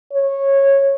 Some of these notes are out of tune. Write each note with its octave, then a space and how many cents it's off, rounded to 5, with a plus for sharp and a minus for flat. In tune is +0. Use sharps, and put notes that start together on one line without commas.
C#5 -15